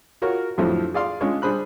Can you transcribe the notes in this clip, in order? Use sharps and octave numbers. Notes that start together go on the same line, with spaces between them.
F4 F#4 A#4 C#5
F2 A2 D3 F3 F#3
G#4 D5 F5 C6
G#3 C#4 D4 F4 G#4 C#5
G3 D4 G#4 C5 B5 F#6